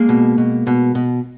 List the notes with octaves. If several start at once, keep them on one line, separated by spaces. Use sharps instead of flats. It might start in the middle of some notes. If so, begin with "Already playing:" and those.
Already playing: G#3 A#3
B2
B2
B2
B2